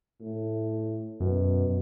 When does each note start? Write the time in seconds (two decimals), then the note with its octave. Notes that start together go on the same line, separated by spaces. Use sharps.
0.21 A2
1.20 F#2 B2